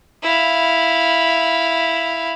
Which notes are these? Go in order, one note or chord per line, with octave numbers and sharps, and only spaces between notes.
E4 F5